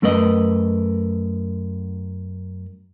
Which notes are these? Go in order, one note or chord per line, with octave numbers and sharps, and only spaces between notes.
F#2 A3 A#4 B4 D#5